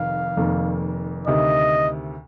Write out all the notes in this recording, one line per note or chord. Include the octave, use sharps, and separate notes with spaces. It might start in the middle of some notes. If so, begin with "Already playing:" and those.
Already playing: F1 F2 D#3 F5
F1 F2 D#3 A#3
D2 C3 D#3 D#5